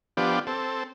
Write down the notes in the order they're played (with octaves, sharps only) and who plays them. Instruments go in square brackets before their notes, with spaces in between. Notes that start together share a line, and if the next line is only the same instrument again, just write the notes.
[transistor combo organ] F3 B3 D4 G4
C4 A4